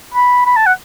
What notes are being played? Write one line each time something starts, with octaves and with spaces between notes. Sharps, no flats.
B5
B5
A5
F#5